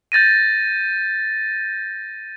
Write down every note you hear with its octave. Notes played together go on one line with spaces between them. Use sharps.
G6 A6 A#6 D#7